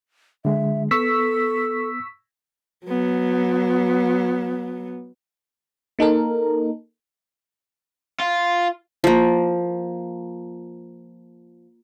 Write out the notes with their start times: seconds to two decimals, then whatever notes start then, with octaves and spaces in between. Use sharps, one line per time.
0.45 D3 G#3 E5
0.91 B3 A4 C#6 E6 B6
2.86 F#3 B3
5.99 A#3 D#4 A4 A#4
8.20 F4
9.04 F3 A#3